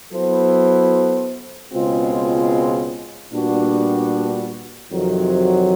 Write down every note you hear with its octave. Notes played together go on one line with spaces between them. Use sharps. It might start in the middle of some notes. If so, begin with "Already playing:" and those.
F#3 B3 E4 A4 C5
C#2 B2 G#3 C4 F4
A#2 G3 B3 D4 F#4
F2 C3 D#3 F#3